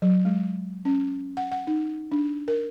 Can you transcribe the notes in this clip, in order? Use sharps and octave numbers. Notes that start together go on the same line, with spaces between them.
F#3
G#3
C#4
F#5
F#5
D#4
D4
A#4